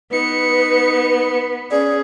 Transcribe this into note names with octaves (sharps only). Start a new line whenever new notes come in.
B3 D#4 B4 C#7
C#4 G#4 D5